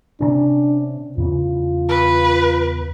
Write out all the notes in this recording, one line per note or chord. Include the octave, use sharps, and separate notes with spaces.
C3 C#4 D4
E2 C#3 F4
B4